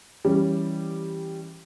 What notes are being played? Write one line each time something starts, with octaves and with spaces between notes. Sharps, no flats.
E3 G3 C#4